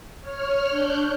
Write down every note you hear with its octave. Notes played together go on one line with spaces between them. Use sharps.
C#5 F6
D4 F#6 G6